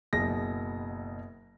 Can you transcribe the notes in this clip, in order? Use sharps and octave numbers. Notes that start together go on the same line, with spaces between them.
F#1 B2 G#4 A#6